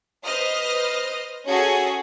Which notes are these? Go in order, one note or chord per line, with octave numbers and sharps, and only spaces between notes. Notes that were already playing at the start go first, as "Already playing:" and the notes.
B4 C5 D#5 D#6 F6
C#4 F#4 G#4 A4